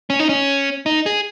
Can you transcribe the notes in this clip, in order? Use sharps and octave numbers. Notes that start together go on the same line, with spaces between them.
C#4
D#4
C#4
D#4
G#4